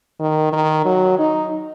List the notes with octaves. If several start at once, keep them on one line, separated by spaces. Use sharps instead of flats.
D#3
D#3
F#3
D#4